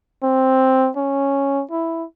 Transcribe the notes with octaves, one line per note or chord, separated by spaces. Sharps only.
C4
C#4
E4